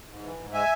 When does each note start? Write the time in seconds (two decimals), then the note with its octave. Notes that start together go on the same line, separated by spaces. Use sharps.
0.08 G#2
0.23 E3
0.38 G#2
0.53 G#3 E5 G#5